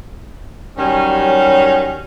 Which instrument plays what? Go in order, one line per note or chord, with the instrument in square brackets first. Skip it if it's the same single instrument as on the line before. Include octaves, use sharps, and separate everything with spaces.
[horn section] D#3 F#3 G3 C#4